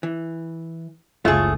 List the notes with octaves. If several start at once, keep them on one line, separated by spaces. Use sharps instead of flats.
E3
F#1 C#2 A3 F4 G#4 C#5 F5